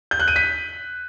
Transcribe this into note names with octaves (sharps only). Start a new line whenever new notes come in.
G6
F#6
D#7
B6